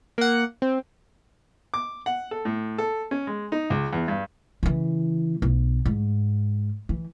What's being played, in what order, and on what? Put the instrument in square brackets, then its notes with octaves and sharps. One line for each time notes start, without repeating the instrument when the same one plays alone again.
[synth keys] A#3 F#5
C4
[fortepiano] D6
F#5
A4
A2
A4
C#4
G#3
D#4
C#2
E2
G2
[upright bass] C#3 E3
B1
G#2
E3